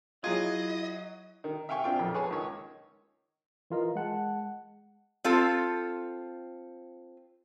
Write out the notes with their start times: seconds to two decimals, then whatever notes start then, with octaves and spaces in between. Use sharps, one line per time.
0.24 F#3 E4 F4 G#4 D#5 G#6
1.44 D#3
1.69 E5 F5 G5 G#5 C#6
1.84 C4 D4 F4 G5
1.98 B1 F2 A#2
2.14 G#4 B4 C#5 G#5 A5
2.31 C#2 D#3 C#5
3.70 E3 F4 A#4 D#5
3.95 G#3 F#5 A5
5.24 C4 F4 A4